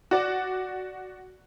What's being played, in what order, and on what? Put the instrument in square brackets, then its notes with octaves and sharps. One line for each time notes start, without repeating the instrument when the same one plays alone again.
[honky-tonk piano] F#4 D5